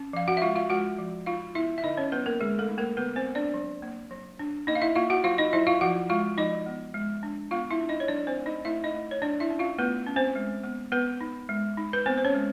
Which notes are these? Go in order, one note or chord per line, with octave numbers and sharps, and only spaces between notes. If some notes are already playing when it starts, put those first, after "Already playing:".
Already playing: C#4
F3 F5
F#4 F#5
E5
G#3 F4 F5
F4 F5
G#3 F#4 F#5
F3
D#4 F4 F5
B3 E4 E5
E5
D3 D#4 D#5
C#4 C#5
F#3 B3 B4
A#3 A#4
D3 G#3 G#4
A3 A4
D#4
A#3 A#4
D3 B3 B4
C4 C5
B3
D4 D5
F#3
A#3
F#3
D4
A#3 D#4 D#5
F5
E4 E5
A#3 F4 F5
F#4 F#5
F#3 F4 F5
D#4 D#5
F#3 E4 E5
F4 F5
F3 F#4 F#5
G#3 F4 F5
F3 D#4 D#5
B3
G#3
D4
B3 F4 F5
E4 E5
D4
D#4 D#5
C#5
F#3 D4 D5
C4 C5
A3
D#4 D#5
A3 E4 E5
D#4 D#5
A3
C#5
F#3 D4 D5
E4 E5
C#4
F4 F5
A3 B3 B4
C#4
C4 C5
G#3
B3
B3 B4
D#4
G#3
D#4
B4
B3 C4 C5
C5
C#4 C#5
G#3